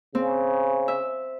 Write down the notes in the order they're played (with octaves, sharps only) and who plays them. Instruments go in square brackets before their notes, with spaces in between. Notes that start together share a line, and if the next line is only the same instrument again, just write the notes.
[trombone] C#3 [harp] C4
[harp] E5